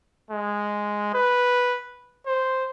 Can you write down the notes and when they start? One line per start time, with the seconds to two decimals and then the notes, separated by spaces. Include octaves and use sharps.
0.30 G#3
1.14 B4
2.26 C5